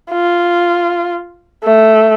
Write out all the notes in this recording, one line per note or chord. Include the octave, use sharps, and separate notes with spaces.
F4
A3